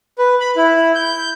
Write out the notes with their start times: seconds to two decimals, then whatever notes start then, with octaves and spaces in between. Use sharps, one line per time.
0.18 B4
0.40 B5
0.57 E4
0.95 G6